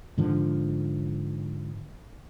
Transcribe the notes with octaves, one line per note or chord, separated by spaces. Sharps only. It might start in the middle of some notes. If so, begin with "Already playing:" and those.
G#2 D3 F3